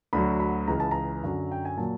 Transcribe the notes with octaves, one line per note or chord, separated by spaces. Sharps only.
D2 D3 F#3 B5
B5
C#2 C#3 E3 A#5
A5
A#5
F#2 D3 F#3
G5
G#5
A#2 F#3 A5